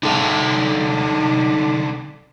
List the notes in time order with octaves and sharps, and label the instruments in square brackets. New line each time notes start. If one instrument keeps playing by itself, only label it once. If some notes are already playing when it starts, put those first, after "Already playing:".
[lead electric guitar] C2 D3 [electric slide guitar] D#4 A4 F5